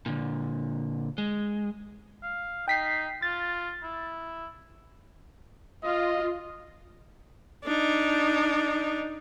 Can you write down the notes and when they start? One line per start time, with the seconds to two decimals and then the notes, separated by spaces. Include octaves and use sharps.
0.06 A#2 D3
1.18 G#3
2.23 F5
2.68 D#4 G5 B6 C7
3.22 F4 A6
3.83 E4
5.84 F4 D#5
7.64 D4 D#4